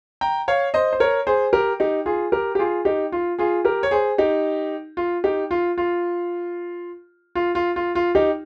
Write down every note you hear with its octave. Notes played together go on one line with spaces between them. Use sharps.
G5 A#5
C#5 F5
C5 D#5
C5
A#4 C#5
G#4 C5
G4 A#4
D#4 G4
F4 G#4
G4 A#4
G4
F4 G#4
D#4 G4
F4
F4 G#4
G4 A#4
C#5
G#4 C5
D#4 G4
F4
D#4 G4
F4
F4
F4
F4
F4
F4
D#4 G4